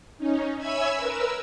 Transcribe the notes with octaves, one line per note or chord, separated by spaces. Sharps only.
C#4 D#4
C#5 E5 G#5 B5 E6 G#6
A#4 B4 E6